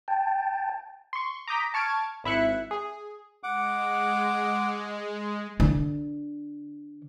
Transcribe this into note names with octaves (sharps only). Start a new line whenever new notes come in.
G5 A5
C6 C#6
A#5 D6 D#6 G6 A#6 B6
A5 C#6 F6 G#6 D7
G#1 E4 E5 F#6 C#7
G#4
G#3 F#5 D6
D3